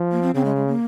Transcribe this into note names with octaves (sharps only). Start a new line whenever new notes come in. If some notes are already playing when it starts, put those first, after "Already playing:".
Already playing: F3
A#3
C4
C#3 C4
G#3
G#3
A#3